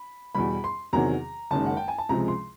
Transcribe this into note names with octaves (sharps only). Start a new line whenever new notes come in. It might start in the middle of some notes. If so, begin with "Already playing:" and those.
Already playing: B5
E2 B2 G3 B5
C6
E2 C3 D#3 F#3 A#5
F#1 F#2 D#3 G#3 A5
F#5
G5
G#5
A5
C#2 C3 F3 G#3 A#5
C6